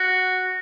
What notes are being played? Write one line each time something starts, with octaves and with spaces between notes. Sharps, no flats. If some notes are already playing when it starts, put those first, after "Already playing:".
Already playing: F#4